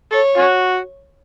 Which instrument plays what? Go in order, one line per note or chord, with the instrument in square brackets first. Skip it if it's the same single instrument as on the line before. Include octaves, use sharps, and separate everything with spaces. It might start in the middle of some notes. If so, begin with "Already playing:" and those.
[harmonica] A4 [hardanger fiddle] C#5
[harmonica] C#4 F#4